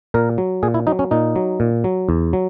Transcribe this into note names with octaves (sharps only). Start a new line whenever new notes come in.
A#2 A#4
F#3
A#2 G#4
E4
F#3 D#4
C#4
A#2 D#4
F#3
A#2
F#3
E2
F#3